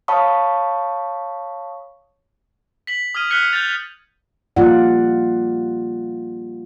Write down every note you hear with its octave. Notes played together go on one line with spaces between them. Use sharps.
C#5 F5 A5 B5 C#6 D#6
B6 F#7
D#6 F6 G#6 D#7
F6 F#6 G#6 B6 C#7
G6 A6 F7
G3 A#3 F4 D5 F#5